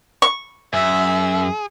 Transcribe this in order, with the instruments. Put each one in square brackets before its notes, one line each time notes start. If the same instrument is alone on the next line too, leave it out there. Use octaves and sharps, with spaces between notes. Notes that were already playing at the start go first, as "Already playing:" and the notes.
[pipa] C#6
[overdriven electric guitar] F#2 [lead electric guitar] G#4 [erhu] E5